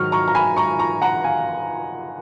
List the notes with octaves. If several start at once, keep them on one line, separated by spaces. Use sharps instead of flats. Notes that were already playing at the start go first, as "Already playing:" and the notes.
Already playing: G#2 D#3 F#3 C#6 F6
A#5 C#6
A#5
G#5 B5
A#5 C#6
A#5 C#6
F#5 A#5
F5 G#5